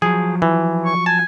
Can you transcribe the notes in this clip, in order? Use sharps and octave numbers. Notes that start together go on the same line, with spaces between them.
F3 F#3 G#4
E3
C#6
G#5 A5